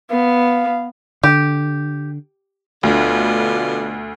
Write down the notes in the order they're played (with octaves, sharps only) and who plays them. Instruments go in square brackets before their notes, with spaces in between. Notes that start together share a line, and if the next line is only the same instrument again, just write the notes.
[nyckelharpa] B3 [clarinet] F5
[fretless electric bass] D3 [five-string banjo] G4
[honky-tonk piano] D2 [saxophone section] B2 D3 F4